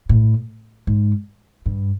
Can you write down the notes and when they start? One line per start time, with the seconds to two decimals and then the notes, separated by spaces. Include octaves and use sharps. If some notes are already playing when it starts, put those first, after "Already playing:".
0.09 A2
0.87 G#2
1.66 G2